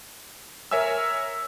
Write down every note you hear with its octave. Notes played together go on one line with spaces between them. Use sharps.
A#4 C#5 E5 G#5 E6